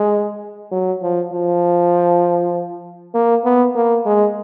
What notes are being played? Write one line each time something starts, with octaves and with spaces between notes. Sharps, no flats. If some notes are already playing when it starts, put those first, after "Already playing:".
Already playing: G#3
F#3
F3
F3
A#3
B3
A#3
G#3